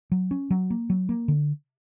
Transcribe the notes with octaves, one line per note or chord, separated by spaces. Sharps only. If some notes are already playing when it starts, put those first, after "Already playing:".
F#3
C#4
F#3
A#3
F#3
A#3
D3